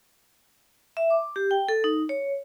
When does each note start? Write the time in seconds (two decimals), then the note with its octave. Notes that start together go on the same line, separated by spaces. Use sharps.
0.97 E5
1.10 D6
1.36 G4
1.51 G5
1.68 A4
1.84 D#4
2.09 C#5